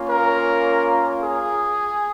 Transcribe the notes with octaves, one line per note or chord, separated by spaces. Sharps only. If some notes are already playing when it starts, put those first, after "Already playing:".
Already playing: A#3 C#4 F4
A#4
G#4